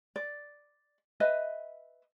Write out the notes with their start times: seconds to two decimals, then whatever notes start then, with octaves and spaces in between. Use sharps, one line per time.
0.16 D5
1.20 B4 D#5 E5